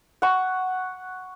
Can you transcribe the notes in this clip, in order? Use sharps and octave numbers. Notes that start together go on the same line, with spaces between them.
F#5 C#6